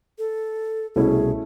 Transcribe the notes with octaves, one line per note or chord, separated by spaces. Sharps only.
A4
C2 B2 A3 C#4 E4 G#4